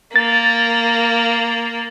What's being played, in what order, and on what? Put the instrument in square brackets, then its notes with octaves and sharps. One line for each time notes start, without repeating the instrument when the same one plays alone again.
[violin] A#3 [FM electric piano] A6